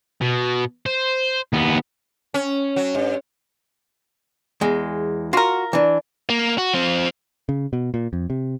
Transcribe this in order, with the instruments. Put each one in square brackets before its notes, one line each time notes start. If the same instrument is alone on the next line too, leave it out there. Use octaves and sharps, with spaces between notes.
[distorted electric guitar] B2
C5
D#2 B3
[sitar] C#4
F#3
G2
[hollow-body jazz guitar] E2 G#3
[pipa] F4 A#4 [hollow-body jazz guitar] F#4
[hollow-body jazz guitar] E3 D4
[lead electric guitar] A#3
F#4
F3 C4
[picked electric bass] C#3
B2
A#2
F2
C3